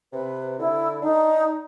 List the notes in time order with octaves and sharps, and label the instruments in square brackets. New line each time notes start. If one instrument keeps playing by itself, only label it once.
[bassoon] C3 [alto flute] B4
[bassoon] D3 [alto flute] E4
[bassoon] D4 [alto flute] D#4